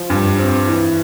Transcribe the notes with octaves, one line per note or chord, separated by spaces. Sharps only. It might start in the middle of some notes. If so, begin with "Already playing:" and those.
Already playing: F3
G2
C4
E3